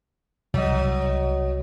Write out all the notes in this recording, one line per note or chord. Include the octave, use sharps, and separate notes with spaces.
C2 F#3 D#5